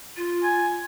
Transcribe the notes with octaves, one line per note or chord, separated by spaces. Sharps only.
F4
G#5